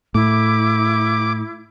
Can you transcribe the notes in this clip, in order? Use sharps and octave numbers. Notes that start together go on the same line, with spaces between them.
A2 E4 D6